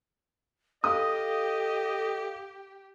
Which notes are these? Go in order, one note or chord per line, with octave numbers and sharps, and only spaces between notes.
G4 A4 D#5 F5 D#6